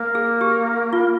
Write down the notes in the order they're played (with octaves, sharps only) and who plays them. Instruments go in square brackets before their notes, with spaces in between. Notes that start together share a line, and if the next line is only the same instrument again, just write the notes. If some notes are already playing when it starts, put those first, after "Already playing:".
Already playing: [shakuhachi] A#3
[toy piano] G#4
G4
F4